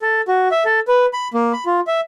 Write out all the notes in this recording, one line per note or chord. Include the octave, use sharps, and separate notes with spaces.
A4
F#4
E5
A4
B4
B5
A#3
B5
F4
E5